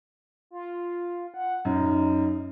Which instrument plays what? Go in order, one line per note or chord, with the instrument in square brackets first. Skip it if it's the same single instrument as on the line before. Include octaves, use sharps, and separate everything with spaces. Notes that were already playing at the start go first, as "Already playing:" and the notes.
[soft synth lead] F4
F#5
[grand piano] F#2 [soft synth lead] D#4